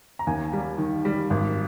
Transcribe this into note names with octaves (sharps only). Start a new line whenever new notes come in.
A#5
D#2 G#5
G3
D#3
G3
G#1